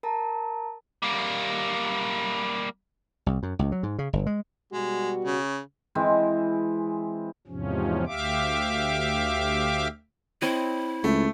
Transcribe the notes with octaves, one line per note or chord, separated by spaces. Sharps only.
A#4 A5 A#5
G3 A#3
C2
F#2
C#2
F#3
G#2
C#3
G1
G#3
B2 G3 G#3 F#4
C#3
E3 G#3 C4
E2 G#2 C3 F3 C#4
D2 G4 E5 F5 D6
C4 E4 C#5 D#5
C#2 A3